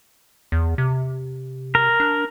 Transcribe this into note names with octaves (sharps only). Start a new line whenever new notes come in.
E2
C3
A#4
D4